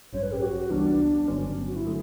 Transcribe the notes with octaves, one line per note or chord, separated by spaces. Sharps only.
A1 G2 F#3 C#4 C#5
B4
G4
F#4
C#2 C#3 E3 G3 B3 D4
D4
G1 G2 D3 F#3 B3 C#4
F#4
E4
D3 F#3 A3